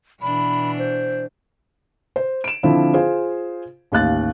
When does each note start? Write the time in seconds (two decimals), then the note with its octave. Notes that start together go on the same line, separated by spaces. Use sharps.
0.22 B2 E3 D4 B5
0.79 C5
2.16 C5
2.44 D7 E7
2.63 D3 F3 C4 D4 E4 F4
2.94 F4 G#4 C5 F5
3.92 A1 D#2 F5 F#6 A6